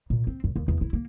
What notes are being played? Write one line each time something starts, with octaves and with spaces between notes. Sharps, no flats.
A#2
C4
F#2
D#2
E2
E4
A#3